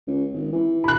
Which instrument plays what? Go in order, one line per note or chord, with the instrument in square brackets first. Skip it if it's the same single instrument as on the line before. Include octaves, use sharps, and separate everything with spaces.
[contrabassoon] C#2
G#1
E3
[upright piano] B5 F#6